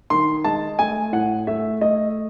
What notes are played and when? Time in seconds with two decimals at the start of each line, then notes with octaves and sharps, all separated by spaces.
0.10 D#3 C6
0.44 G#3 A5
0.79 A3 G#5
1.12 A2 F#5
1.47 A3 E5
1.81 A3 D#5